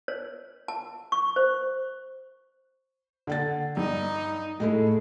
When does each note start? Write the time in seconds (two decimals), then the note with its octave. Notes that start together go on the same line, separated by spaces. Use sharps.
0.08 C#5
0.68 A5
1.12 C#6
1.36 C5
3.27 D3 F#5 A6
3.77 G2 D#4
4.60 A2 G#3 A3 E4